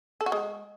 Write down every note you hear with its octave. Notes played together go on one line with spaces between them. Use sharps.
A4
F#4
G#3